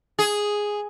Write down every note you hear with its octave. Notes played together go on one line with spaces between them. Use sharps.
G#4